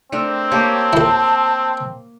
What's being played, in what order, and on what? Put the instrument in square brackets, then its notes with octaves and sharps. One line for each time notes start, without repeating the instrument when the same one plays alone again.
[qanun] A3 D4 A#4 [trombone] C4
[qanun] A#3 G4 C#5 [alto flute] A5
[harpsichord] E4 A4